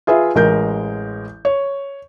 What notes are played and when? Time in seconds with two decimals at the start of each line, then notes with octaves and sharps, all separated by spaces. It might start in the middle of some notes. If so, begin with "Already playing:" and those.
0.07 F4 G#4 B4 E5
0.35 A1 G#3 A#4 G6
1.45 C#5